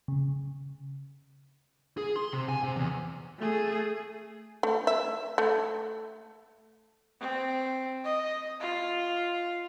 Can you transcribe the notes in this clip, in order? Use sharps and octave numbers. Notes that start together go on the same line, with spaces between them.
C#3
G#4
C6
C3
G#5
C3
E2
A3 G#4
A3
E5
A3
C4
D#5
F4